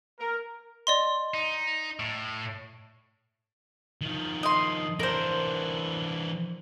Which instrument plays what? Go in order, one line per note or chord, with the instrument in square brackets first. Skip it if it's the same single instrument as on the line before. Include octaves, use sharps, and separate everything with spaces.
[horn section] A#4
[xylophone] D5 D#5 C6
[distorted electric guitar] D#4
A2
D#3 F3
[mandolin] D#5 C6
[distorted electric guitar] E3 D4 [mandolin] A#4 C5